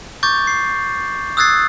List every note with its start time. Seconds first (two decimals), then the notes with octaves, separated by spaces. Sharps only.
0.23 C#6 D6 G6 A6
0.47 C7
1.37 D#6 E6 F#6 G#6 A6 C7